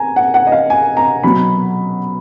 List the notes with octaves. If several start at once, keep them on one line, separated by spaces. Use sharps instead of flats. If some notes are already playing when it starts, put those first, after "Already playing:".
Already playing: G#5 A#5
F#5
F#5
D#5
F5
G#5
A#5
B2 F#3 B5